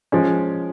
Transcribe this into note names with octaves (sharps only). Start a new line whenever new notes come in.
F3 G#3 C#4